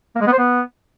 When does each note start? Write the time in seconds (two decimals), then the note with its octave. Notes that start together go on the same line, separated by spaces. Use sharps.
0.15 A#3
0.21 G#3
0.27 B3
0.32 C5
0.38 B3